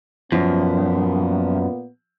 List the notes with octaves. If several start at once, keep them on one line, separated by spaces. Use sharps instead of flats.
F#2 A#2 F3 B3